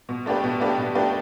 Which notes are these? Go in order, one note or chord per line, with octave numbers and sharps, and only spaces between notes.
B2
A3 D4 G4 B4
B2
A3 D4 G4 B4
B2
A3 D4 G4 B4